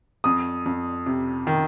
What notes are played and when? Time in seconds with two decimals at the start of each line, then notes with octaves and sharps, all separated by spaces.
0.24 F2 D#6
0.66 F2
1.06 C3
1.47 D#3